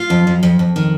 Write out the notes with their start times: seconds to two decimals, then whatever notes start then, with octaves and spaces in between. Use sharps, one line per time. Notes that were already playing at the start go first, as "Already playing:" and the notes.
Already playing: F4
0.10 F2
0.27 F2
0.43 F2
0.59 F2
0.76 D#3